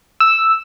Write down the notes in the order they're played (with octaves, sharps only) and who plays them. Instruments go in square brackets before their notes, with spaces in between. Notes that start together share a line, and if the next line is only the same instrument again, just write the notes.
[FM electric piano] E6